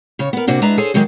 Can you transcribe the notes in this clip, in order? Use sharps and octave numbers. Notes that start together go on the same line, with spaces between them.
C#3 C#5
B3 A#4
C3 A#3 D4 F#4
G#3 D4 B4 E5 A#5
G#4 A4 C5 C#5 G#5
D3 D#3 F#3 G#3